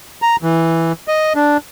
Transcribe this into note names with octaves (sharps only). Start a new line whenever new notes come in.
A#5
E3
D#5
D4